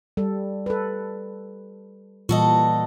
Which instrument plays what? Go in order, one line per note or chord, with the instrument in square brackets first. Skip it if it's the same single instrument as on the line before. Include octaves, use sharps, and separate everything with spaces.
[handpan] G3 A4
A4 B4
[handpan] A#2 E3 G3 [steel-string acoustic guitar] F#4 A4 D#5